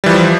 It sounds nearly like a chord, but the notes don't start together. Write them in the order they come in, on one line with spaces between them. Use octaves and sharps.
G3 E3 F3